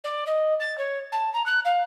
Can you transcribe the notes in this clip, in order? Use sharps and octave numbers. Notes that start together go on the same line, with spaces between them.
D5
D#5
A6
C#5
A5
A#5
F#6
F5